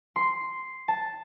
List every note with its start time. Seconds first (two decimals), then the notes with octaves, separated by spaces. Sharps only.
0.16 C6
0.88 A5